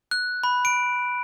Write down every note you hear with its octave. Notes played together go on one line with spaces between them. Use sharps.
F#6
B5
D7